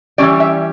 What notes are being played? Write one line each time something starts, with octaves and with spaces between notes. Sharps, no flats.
E3 G3 C#4 D5
E5